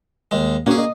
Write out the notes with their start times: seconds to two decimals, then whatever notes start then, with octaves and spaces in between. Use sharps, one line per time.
0.31 D#2 G#3
0.66 A#3 C#4 F#4 G#4
0.78 D#5